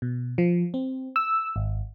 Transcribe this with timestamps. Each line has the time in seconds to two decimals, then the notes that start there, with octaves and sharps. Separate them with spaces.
0.02 B2
0.38 F3
0.74 C4
1.16 E6
1.56 G#1